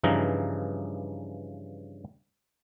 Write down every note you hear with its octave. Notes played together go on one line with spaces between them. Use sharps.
G2 C#3 E3 F3 D#4 A#5